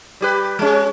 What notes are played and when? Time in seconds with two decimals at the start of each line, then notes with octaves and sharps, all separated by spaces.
0.21 G3 G4 B4
0.59 G#3 C#4